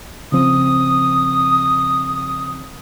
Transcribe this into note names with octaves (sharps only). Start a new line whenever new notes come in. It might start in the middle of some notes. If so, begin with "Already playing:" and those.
C#3 F3 C4 D#6